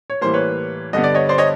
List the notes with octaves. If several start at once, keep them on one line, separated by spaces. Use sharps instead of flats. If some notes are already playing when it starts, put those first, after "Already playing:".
C#5
A2 E3 G3 A#3 C5
B4 C#5
G2 D3 G3 B3 D#5
D5
C#5 D#5
C5 D5
C#5 D#5